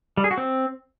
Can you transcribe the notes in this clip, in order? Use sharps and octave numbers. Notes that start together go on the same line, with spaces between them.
G3
G#4
F#4
C4